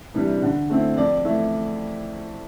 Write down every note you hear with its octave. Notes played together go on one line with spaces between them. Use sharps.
C3 E3 G3 D4
D3
A3 C4 E4
F2 D5
E3 A3 E4